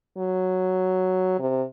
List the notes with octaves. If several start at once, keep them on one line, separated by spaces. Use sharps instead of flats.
F#3
C3